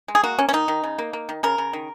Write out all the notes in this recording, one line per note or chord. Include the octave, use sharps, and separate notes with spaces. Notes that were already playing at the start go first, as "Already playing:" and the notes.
G#3
G#4
A#3 F#4
A#3 C#4
C#4
D#3 D#4
D#3
C#3
A#3
A#3
D#3
C#3 A#4
C#3
D#3